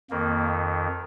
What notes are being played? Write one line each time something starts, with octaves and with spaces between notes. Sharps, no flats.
F2 D#3 A#3